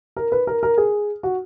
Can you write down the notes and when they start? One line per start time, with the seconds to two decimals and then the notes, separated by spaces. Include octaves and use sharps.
0.16 A#4
0.32 B4
0.47 A#4
0.63 A#4
0.78 G#4
1.23 F#4